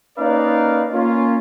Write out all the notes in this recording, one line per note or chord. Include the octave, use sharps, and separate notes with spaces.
A#3 C#4 D#4 B4 D5 F5
A#3 C#4 F4